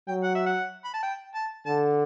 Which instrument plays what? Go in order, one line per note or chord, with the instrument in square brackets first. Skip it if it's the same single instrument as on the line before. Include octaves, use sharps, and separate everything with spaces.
[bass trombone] F#3 [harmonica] G5
[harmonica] F#5
E5
F#5
B5
A5
G5
A5
[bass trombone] D3 [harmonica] A5